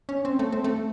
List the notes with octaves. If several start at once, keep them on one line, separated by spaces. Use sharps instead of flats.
C#4
C4
A3
C4
A3